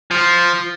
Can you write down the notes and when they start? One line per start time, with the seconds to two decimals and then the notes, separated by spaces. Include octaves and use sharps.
0.11 F3